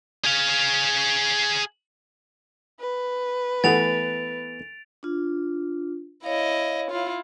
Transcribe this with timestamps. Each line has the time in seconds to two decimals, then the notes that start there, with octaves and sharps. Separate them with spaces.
0.25 G#4 F5
2.80 B4
3.64 E3 A3 B3 A6 D7 F7
5.03 D4 F4
6.24 E4 C#5 D#5 F5
6.91 E4 F4